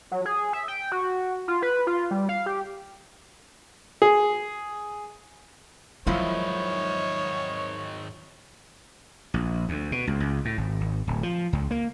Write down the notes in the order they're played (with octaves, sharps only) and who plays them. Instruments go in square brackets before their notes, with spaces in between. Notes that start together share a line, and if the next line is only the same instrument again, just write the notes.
[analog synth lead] F#3
G#4
E5
G5
F#4
F4
B4
F4
G3
F5
G4
[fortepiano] G#4
[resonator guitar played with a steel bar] E2 F3 E4 [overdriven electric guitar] G#2 D#3 [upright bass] F#3 [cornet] C#5
[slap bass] A#1
D2
B2
C#2
C#2
A2
G#1
G#1
D1
F3
C#2
A#3